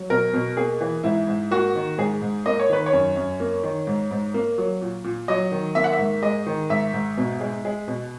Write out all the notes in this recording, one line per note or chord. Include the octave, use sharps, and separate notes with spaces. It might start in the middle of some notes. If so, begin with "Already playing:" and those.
Already playing: F#3
B2 A#4
B2
A#3 G#4
E3
G#2 E4
G#2
A#3 F#4
D#3
G#2 G#4
G#2
A#3 D#5
C#5
D#3 B4
C#5
F#2
F#2
A#3
D#3
G#2
G#2
A#3
F#3
A#2
A#2
F#3 D#5
D#3
A#3 E5
F#5
E5
G#2
G#3 D#5
D#3
G#2 E5
G#2
B2
G#3
G#3
B2